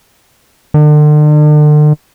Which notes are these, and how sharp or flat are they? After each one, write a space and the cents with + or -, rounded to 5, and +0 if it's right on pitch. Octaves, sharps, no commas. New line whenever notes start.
D3 +40